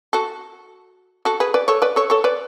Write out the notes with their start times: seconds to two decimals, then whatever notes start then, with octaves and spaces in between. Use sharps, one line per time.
0.13 F#4 A4
1.25 F#4 A4
1.40 G#4 B4
1.54 B4 D5
1.68 A4 C#5
1.82 B4 D5
1.96 A4 C#5
2.10 A4 C#5
2.24 B4 D5